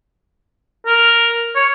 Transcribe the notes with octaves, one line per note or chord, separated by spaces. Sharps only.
A#4
C#5